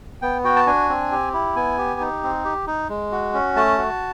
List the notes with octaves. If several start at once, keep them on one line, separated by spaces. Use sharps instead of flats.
B3 G5
F#4 G5
A5
D4 G#5
C4
G4
E4
B3 G#5
G4
D#4
C4
G4
D#4
G#3
F#4
C#4
A3 A5
F#4